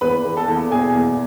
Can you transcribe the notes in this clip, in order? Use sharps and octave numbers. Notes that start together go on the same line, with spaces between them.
E2 B4 B5
E2
A4 A5
E2
B2 G#4 G#5
E2